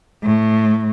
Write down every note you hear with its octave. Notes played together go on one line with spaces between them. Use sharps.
A2